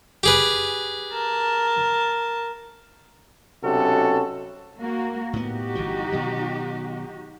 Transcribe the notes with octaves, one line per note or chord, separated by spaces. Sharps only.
G4 G#4 B4
A#4 A5
B1 C3 C#4 F#4 A4
A#3 F#4
A2 B3 D#4 F#4 G4
G1 E3 F3
B2 D#3 F#3